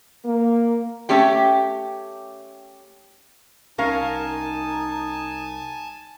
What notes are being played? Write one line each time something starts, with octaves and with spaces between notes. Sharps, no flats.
A#3
A3 C#4 G4 G5
C2 C#4 D#4 A#4 F5 G#5 A5